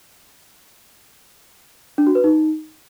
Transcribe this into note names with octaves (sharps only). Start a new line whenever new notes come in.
D4
F#4
B4
D#4